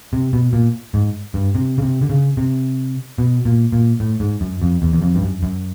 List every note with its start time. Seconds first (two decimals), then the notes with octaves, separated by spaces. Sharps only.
0.13 C3
0.33 B2
0.53 A#2
0.94 G#2
1.34 G2
1.55 C3
1.78 C#3
1.82 C3
2.02 D3
2.10 C#3
2.37 C3
3.18 B2
3.45 A#2
3.72 A#2
4.00 A2
4.20 G#2
4.41 F#2
4.62 F2
4.82 E2
4.93 E2
5.02 F2
5.15 G2
5.22 F#2
5.43 F#2